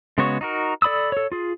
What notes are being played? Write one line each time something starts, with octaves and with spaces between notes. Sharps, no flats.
C#3 G#3 B3 F#4 C#5
D#4 F#4 A#4
A4 D5 B5 D#6 E6
A4 C#5
F4 G#4